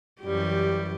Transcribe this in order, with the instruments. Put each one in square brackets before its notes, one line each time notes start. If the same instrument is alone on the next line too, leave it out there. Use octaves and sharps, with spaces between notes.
[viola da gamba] F#2 E3 G4 [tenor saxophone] G3